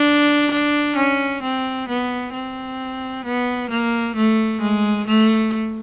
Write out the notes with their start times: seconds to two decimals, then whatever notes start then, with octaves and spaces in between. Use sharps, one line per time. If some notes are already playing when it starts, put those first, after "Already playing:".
Already playing: D4
0.51 D4
0.96 C#4
1.42 C4
1.88 B3
2.33 C4
3.25 B3
3.70 A#3
4.16 A3
4.61 G#3
5.07 A3